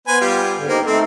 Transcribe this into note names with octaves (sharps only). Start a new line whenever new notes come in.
B3 B4 C5 G#5
G3 F4 G4
G#2 D3
A#3 D#4 G4 C5
A3 C4 D#4 A4